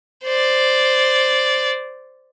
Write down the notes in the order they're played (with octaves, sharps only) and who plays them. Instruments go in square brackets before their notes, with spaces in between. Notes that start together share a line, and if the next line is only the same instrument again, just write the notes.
[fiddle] C5 D5